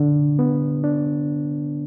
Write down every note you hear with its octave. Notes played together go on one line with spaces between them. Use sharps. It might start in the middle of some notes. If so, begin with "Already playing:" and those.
Already playing: D3 D4
B3
D4